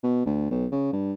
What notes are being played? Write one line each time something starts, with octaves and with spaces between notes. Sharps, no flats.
B2
D2
B1
C#3
G2